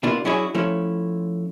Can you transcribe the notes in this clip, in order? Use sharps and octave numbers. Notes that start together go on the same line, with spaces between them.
B2 A#3 D4 E4 F4
F#3 C#4 D4 E4 F#4 G#4
F3 A3 C#4 E4